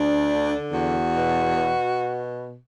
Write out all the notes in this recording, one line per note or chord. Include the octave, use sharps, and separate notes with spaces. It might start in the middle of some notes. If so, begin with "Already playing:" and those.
Already playing: D2 D4
D3
E2 F#4
B2
B2